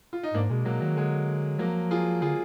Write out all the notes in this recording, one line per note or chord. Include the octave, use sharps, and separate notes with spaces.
F4
D#4
G#2 A#3 D4
B2 G#3
B2 F#3 A#3
D#3 F#3
D3 G#3
F3 F#3 A#3
F4 G#4
D3 F4 G#4